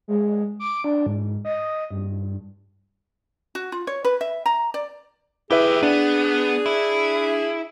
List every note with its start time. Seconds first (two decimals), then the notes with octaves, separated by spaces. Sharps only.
0.08 G#3
0.60 D6
0.84 D4
1.06 G#2
1.45 D#5
1.91 G2
3.55 F#4
3.72 F4
3.87 C#5
4.05 B4
4.21 E5
4.46 A#5
4.74 D5
5.51 E3 E4 G4 G#4 B4 E5
5.83 B3 D4
6.66 E4